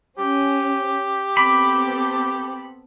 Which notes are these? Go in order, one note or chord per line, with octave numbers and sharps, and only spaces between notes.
C#4 G4
B3 C4 A4 B5 D6